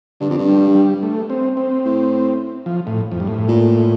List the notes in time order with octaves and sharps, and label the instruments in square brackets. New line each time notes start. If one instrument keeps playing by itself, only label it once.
[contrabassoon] G2 [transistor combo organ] D3
[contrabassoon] F2
G2
[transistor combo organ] G3
G3
A3
C4
C4
[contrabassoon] A2
[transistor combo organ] F3
A2
F2
G2
A2
[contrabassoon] A#2